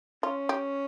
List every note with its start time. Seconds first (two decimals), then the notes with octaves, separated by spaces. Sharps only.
0.23 C#4 F4
0.49 G4